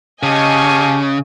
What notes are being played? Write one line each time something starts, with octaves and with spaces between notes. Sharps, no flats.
C#3 G4 D#5 F5 G#5 A5 C#6